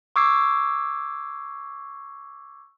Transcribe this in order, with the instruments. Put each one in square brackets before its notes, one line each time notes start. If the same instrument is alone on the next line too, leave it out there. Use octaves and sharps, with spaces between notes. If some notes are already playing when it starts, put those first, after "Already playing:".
[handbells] C#6 D6 E6 G#6 C7